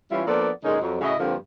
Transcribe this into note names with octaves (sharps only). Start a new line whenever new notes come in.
E3 G3 C#4 E4 F4
F3 A#3 B3 D4 A4 D5
A#2 D3 G#3 C#4 D#4 G#4
F2 F#3
A2 C#3 E4 F#4 D#5
G2 D3 F3 A#3 C4 G4